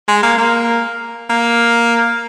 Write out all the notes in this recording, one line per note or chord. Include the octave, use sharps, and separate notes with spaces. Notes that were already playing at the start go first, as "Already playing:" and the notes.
G#3
A#3
A#3
A#3